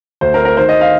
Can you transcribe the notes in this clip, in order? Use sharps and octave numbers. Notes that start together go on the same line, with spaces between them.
D2 C5
A#4
C4
A#4
D#3 C5
D#5
F5